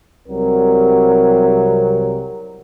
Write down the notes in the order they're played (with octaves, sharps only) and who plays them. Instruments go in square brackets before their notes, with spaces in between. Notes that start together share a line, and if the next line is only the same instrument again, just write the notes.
[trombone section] C2 C3 F#3 G3 A#4